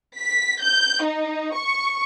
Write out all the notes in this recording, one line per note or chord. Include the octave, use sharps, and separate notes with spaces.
B6
G6
D#4
C#6